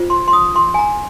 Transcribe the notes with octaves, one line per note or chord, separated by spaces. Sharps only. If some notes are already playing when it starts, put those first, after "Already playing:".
Already playing: F4 C5
C6
C6
D#6
C6
G#5
A#5